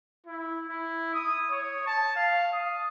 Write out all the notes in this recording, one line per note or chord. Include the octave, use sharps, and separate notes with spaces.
E4
E4
D#6
C#5
A5
F5
D#6